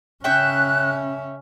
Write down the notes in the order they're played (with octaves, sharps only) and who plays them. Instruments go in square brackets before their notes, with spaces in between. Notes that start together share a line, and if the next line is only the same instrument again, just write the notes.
[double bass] C#3 C#4 [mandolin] C#5 E5 G5 [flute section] F#6